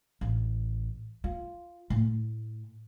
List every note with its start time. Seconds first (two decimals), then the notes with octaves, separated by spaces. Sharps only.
0.21 A1
1.24 F4
1.90 A2